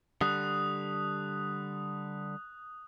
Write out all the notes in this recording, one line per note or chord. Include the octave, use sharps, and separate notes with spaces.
D3 G3 D#6 F#6